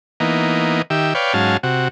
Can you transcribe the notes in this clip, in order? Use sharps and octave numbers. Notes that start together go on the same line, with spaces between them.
E3 A#3 B3 D#4
D#3 G4 E5
B4 C#5 D5 F5 G5
G#2 F#3 C#4 F5 A5
C3 F#4